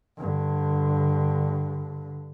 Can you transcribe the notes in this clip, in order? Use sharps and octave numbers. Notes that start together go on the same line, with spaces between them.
G2 D3